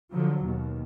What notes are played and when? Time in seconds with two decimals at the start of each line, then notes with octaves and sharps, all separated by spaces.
0.12 D3 F3 F#3
0.43 D#2 B2